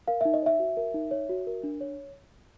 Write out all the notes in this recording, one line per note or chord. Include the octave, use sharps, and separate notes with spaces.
A#4 F5
D#4 E5
D#5
C#5 E5
F#4
A#4
D#4
C#5
F#4
A#4
D4
C#5